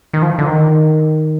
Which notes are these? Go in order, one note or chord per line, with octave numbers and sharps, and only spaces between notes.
D#3
F3
D3
D#3